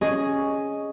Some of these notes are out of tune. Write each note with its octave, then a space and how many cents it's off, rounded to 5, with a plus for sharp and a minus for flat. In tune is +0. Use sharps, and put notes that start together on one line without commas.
C#4 +0 G#4 +0 D#5 +0